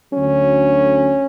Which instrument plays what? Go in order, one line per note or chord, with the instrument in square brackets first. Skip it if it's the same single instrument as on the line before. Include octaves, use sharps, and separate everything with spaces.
[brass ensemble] D2 D3 F#3 C#4